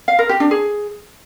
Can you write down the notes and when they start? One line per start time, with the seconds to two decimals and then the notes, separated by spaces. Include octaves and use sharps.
0.08 F5
0.19 A#4
0.29 G4
0.40 D4
0.51 G#4